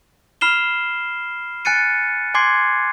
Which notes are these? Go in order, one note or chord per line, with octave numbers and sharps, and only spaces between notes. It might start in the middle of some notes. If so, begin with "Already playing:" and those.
B5 F6 C7 E7 G7
G#5 F#6 A6 C#7 D#7
G#5 C6 D6 G#6 C7